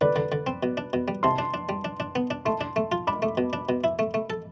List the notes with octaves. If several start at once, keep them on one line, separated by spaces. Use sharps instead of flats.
D3 B4 D5
D3
D3
C4
B2
D4
B2
G3
C3 A5 C6
D4
D4
G3
D4
D4
B3
D4
A3 A5 C6
D4
A3
F4
D4 B5 D6
A3
B2
D4
B2
E4
A3
A3
A4